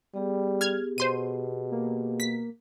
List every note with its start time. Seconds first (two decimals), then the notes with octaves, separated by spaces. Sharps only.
0.14 G3 B3 G4 G#4
0.61 F6 G#6
0.98 B2 C5 C6 D#7
1.72 A#3
2.20 B6